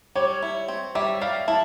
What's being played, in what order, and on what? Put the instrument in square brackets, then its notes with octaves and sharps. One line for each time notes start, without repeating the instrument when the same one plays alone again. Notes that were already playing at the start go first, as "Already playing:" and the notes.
[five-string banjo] G3 [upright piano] C#5
[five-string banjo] E4
C4
[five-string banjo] G3 [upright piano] E5
[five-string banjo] G3 [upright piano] F5
[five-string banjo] E4 [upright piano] A5